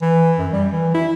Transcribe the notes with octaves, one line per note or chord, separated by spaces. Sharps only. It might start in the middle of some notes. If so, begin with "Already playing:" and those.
E3
F#2
G3
E3
E4